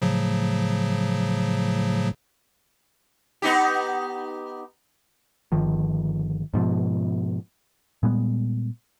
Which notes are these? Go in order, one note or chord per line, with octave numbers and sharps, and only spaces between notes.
A2 C#3 F3 F#3
B3 D#4 G4
G1 D#3 F3
G#2 B2 F3
A#2 G3 G#3 B3